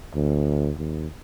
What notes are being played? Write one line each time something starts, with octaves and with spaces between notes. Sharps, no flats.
D2
D#2